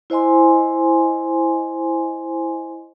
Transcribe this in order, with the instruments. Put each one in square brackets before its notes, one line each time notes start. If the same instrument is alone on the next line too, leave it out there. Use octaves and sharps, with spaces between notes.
[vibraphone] E4 C5 D#5 G#5 C6